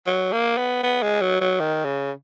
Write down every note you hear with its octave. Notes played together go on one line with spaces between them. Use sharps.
F#3
A#3
B3
B3
G#3
F#3
F#3
D#3
C#3